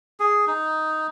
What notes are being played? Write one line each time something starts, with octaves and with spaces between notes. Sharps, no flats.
G#4
D#4